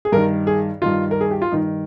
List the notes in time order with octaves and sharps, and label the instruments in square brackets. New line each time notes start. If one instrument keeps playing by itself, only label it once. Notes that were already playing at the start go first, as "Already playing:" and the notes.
[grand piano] G#4
G2 D#3 A#4
G#4
G2 D#3 F4
A#4
G#4
G4
F4
G2 D#3 D#4